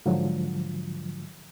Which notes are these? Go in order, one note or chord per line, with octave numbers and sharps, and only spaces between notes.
G#2 D3 F3 F#3